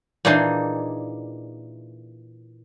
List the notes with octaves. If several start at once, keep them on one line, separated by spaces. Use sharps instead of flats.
A#2 E3 D4 D#4 G#4 C6